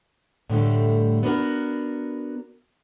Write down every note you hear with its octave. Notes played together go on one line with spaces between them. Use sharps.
A2 D3 G3 A3
B3 D4 F#4 A#4